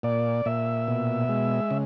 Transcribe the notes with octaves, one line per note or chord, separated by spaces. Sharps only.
A#2 D5
A#2 E5
B2
G#3
C#3